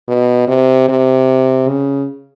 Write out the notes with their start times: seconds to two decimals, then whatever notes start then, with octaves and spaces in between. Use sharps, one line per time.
0.08 B2
0.48 C3
0.89 C3
1.69 C#3